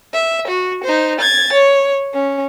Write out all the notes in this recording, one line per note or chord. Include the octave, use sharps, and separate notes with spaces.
E5
F#4
D#4 C5
G#6 A6
C#5
C#4